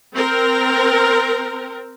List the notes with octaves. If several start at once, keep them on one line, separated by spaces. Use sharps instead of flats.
C4 A#4